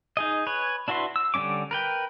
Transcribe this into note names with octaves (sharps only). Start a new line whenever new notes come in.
D#4 G#4 D#5
B4 C#5 G#5
D4 E4 F#4 B4 C6
E6
D3 G3 A#3 C#4 D6
A#4 B4 G5